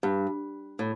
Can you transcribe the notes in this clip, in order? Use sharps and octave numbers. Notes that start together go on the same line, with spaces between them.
G2
A2